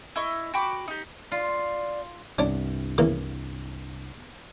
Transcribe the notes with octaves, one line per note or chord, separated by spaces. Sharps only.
E4 D#5 C#6
F#4 G5 B5 D6
D#4 G4
F4 D5
C2 G2 C#4 D4
C#3 E3 A#3